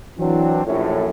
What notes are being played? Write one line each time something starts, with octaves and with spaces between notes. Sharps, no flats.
E3 F#3 C4 D4
A#1 F#2 A2